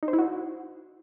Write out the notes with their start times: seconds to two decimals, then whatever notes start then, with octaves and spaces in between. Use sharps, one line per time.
0.03 D#4
0.08 C5
0.13 E4
0.19 F#4